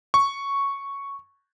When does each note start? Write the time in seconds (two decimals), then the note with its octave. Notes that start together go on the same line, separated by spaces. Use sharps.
0.14 C#6